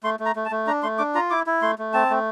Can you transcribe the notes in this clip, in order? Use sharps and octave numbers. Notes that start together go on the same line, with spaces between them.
A3 C6
A3
A#5
A3
A5
A3
D4 A#5
A3 C6
D4 D6
F4 A#5
E4 D6
E4
A3 C6
A3
C4 A5
A3